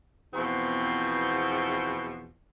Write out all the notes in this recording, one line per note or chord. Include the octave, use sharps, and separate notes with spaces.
E2 B2 F3 C4